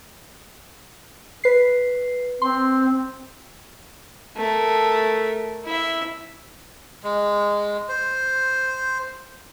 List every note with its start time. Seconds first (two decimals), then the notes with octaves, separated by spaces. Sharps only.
1.44 B4 C7
2.42 C4 C6
4.36 A3 A#4
5.65 E4 E5
7.04 G#3
7.89 C5